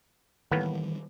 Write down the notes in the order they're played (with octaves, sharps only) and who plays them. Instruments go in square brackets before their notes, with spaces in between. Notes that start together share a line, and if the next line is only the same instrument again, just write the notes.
[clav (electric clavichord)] A2 A#3 B3 [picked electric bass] D#3 E3 G3